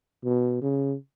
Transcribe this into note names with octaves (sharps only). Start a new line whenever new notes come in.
B2
C#3